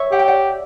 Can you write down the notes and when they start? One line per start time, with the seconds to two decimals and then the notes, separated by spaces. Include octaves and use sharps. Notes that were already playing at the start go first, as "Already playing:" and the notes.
Already playing: C#5 E5
0.12 G4 F#5
0.19 G5
0.28 D5 F#5